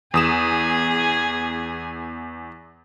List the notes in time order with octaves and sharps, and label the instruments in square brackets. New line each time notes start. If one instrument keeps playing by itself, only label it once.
[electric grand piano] E2 D#6 E7 [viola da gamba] G#4